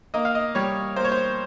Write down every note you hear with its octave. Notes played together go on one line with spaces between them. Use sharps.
A#3 D#5
F5
D#5
G3 C#5
A#3 C5
C#5
C5